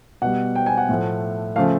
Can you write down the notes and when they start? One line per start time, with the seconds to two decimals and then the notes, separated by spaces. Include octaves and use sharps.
0.22 B2 G3 F#5
0.55 G5
0.66 G#5
0.77 F#5
0.89 A2 F3 A3
1.56 C#3 F3 A3 F5